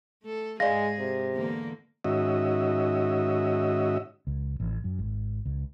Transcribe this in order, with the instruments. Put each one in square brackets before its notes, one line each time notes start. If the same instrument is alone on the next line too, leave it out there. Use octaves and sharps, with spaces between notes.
[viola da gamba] A3 A4
[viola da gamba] G#2 G#4 [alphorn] G#3 [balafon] D5 F5 [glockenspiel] A#6
[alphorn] C3
[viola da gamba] E2 D3 A#3
[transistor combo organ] G#2 D#3 C#4 F#4 D#5 E5
[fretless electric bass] C#2
A1
F#2
G#1
C#2